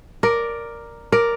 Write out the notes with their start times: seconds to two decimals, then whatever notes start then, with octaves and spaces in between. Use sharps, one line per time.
0.23 A#4 D5
1.12 A#4 D5